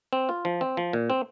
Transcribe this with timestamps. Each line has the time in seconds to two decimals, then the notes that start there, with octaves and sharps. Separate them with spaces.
0.13 C4
0.29 F4
0.45 F3
0.61 C4
0.77 F3
0.93 A#2
1.10 C4